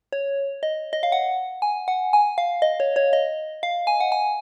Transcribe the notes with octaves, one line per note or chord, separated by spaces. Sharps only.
C#5
D#5
D#5
F5
F#5
G#5
F#5
G#5
F5
D#5
C#5
C#5
D#5
F5
G#5
F#5
G#5